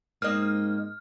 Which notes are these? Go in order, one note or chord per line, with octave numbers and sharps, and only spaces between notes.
G#2 A#3 C4 D#5 F6